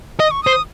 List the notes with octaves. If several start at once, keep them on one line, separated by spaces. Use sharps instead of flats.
D#5 D#6
C#6
C5 D#6